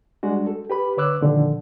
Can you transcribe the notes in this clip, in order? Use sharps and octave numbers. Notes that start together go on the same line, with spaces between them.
G3 G#3 D4 F#4
A4
G4 B4 B5
D3 B4 C#5 D6 E6 F#6
A#2 D3 D#3 F3